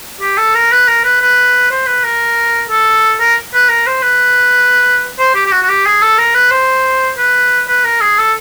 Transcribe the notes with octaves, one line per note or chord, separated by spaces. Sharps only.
G4
A4
A#4
B4
A#4
B4
B4
C5
B4
A#4
A4
A#4
B4
A#4
C5
B4
C5
G4
G4
F#4
F#4
G4
G#4
A4
A#4
B4
C5
B4
B4
A#4
G#4
A4